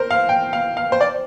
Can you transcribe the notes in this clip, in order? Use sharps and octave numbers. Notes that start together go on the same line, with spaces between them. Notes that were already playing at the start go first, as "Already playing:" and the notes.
Already playing: A#4 C5
F5
G5
F5
F5
C5
D5